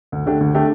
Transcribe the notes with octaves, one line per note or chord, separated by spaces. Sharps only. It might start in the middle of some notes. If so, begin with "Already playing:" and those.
D2
D3 A3 D4 G4
D2
D3 A3 D4 G4